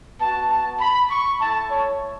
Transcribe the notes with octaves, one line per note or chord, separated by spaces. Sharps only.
B3 F#4 A5
A5
B5
C#6
A3 E4 A5
C#5